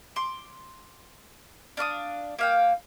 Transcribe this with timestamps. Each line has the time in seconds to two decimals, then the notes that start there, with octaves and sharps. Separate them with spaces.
0.16 C6 D6
1.77 D4 F5 C#6 D#6
2.39 A#3 F5 G5